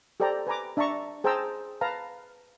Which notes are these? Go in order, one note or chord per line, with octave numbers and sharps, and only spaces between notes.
G4 A4 C5 D5 G5 A#5
B4 G#5 A#5 D6
D4 E5 A5 A#5 C#6
G#4 C5 G5 A5 A#5 E6
B4 F5 A5 A#5